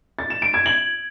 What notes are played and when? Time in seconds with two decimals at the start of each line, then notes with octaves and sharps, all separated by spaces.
0.19 A6
0.30 E7
0.42 D7
0.54 G#6
0.66 F#7